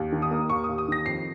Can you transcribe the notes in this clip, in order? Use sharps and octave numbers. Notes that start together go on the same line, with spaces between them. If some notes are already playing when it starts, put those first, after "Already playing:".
Already playing: D#2
D#3
D#6
A#3
D#2 C#6
D#6
D#2
D#6
D#3 A#6
F2 C7